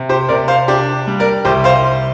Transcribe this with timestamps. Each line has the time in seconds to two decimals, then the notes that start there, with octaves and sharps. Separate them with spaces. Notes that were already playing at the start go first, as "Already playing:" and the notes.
Already playing: C3
0.09 G4 C5
0.29 C3 A#4 D5
0.48 C5 F5
0.68 D4 G4
1.07 G3
1.20 A#4 D5
1.45 C2 G4 C5
1.64 C5 F5